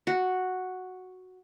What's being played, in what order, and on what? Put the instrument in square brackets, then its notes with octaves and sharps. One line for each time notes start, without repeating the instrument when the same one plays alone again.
[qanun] F#4